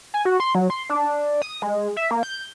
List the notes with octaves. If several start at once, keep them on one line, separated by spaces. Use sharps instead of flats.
G#5
F#4
C6
F#3
C6
D4
D#6
G#3
E5
A#3
G6